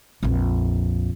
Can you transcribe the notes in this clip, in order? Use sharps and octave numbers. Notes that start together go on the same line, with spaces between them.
A#1 F2